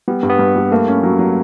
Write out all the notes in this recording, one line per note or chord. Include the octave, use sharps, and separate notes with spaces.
G3 B3
G2
B3
G2
G3
A3 A#3
C#4
F#3
F#3